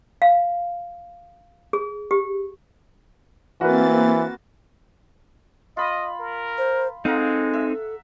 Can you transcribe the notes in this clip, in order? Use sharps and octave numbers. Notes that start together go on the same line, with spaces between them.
F5
G#4
G4
E3 A#3 C4 F#4 A#4 B4 A6
F4 D#5 B5
A#4
C5
G#3 C4 D#4 A4 F5 F#5 A#5
E5